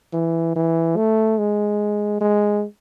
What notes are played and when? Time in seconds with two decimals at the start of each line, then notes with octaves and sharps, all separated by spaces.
0.13 E3
0.56 E3
0.97 A3
1.38 G#3
2.21 G#3